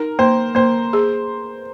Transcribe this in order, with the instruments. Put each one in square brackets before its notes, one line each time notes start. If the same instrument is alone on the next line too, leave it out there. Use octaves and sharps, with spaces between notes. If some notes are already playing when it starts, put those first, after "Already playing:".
Already playing: [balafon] D#4 [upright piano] A#4
[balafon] A#3 [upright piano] C5
[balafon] A#3 [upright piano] C5
[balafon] G#4